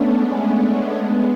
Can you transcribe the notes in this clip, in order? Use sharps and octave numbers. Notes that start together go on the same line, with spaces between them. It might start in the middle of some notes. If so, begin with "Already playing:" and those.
Already playing: A3 B3 C#4 D4
G#3 B3
B3 D4
G#3 B3